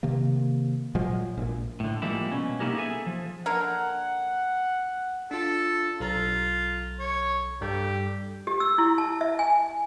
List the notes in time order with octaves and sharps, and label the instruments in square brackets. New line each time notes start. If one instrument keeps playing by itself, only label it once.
[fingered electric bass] C3 D#3 A#3
A#2 F3 F#3 G#3
A#1 A#2
[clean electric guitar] A2 D3
F3 G3 G#3 A#3 E4
B2 C#4
A#3 B3 D#4 E4 G4 A#4
G#4 A4 E5 G#5
F3
[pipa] D3 A#3 A#4 [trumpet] F#5
[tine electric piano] D4 F4 [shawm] A4
[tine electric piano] B1 A4 A#5 [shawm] F4
[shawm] C#5
[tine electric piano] G2 G3 A4 [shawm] G4
[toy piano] G4
E6
E4
A5
E5
G#5